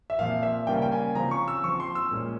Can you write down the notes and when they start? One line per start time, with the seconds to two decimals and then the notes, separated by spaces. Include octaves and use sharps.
0.10 E5
0.19 A#2 F3 C4 F5
0.43 E5
0.67 C#3 G3 A#3 C#4 G5
0.82 G5
0.92 G#5
1.15 C#3 F3 C4 A#5
1.31 C#6
1.48 E6
1.63 F3 C4 C#6
1.80 C6
1.95 E6
2.11 A#2 G#3 C#4